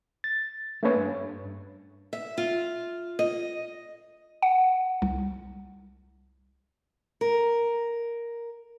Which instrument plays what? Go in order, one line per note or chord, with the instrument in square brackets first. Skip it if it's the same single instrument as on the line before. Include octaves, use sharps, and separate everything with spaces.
[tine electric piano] A6
A3 A#3 C#4 B4 C#5
G2
[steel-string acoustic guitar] E5
F4
D#5
[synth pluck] F#5
C2
[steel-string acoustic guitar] A#4